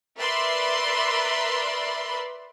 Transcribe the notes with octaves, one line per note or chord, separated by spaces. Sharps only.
A#4 B4 D5 E5 B5 C6